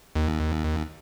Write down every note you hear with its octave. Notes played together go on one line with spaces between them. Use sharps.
D#2